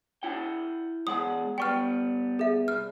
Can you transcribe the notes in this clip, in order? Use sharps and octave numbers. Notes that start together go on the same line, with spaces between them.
E4 F#5 G5
E2 G#3 F#5 D#6
G3 B3 G5 C#6 F6
G#4 E5
C2 F6